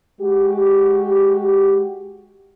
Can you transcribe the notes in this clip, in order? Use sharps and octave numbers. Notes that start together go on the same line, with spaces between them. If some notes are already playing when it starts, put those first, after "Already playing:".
G#3 F#4 G4